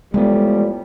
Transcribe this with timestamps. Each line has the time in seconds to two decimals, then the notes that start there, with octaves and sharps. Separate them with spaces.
0.14 A2 F3 G3 G#3 A#3 B3